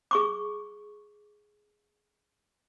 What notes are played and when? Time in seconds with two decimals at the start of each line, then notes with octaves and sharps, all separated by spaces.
0.11 G#4 C#6 D6